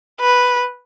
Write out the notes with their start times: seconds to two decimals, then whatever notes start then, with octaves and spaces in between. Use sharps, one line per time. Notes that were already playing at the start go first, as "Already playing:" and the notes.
0.21 B4